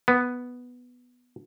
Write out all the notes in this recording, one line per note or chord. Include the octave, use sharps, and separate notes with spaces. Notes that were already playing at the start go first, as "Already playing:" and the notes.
B3